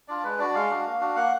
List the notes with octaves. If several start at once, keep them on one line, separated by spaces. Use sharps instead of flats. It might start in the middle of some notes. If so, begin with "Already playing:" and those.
D4 F4 D5
G#3 B4
D4 F#4 D5
G#3 F5
D4 F#4
A#3
D4 F#4
A#3 F#5